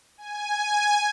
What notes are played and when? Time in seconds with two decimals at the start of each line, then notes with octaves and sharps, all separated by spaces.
0.18 G#5